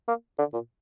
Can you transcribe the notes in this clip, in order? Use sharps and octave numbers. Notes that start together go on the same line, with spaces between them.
A#3
D3
A#2